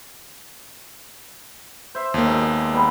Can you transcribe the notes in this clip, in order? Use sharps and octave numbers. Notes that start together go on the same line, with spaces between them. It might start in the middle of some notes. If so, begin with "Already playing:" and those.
C5 E5
D#2 A#3
G#2 B2 G#3
G3 G#3 B3